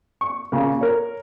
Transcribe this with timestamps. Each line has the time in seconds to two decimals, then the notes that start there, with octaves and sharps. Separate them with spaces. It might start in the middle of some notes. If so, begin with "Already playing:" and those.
0.21 C#6
0.52 A#2 C#3 A#3
0.81 A#4 C#5